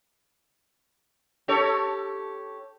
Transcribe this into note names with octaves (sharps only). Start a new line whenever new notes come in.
G4 A4 C#5